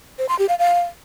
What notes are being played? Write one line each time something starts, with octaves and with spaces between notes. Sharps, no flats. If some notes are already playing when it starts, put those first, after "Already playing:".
C5
C6
G4
F5
F5